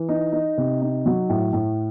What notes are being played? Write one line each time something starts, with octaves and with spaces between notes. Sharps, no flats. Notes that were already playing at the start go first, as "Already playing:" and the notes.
Already playing: E3
D#4
D#4
C3
D#4
F#3
A2
A2